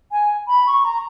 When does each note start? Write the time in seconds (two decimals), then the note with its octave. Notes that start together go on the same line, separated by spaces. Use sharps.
0.12 G#5
0.48 B5
0.67 C#6
0.85 A#5